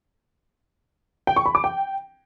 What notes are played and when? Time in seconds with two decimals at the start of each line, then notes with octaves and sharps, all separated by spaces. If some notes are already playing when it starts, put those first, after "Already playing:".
1.27 G5
1.36 C#6
1.46 B5
1.55 D6
1.64 G5